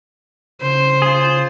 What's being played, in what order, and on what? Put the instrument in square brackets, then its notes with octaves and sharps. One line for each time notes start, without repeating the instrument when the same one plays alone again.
[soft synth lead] C#3 [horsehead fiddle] C5
[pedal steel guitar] F4 G#4